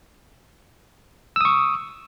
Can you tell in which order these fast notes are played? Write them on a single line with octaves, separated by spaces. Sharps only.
E6 D#6 C#6